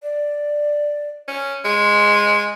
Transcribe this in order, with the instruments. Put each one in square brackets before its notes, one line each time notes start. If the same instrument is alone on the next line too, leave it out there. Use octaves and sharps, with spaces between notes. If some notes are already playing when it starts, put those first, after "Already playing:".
[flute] D5
[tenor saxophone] C#4
[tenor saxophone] G#3 [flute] C6